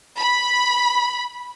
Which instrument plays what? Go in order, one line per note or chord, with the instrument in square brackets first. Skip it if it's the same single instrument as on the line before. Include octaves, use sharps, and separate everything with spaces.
[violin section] B5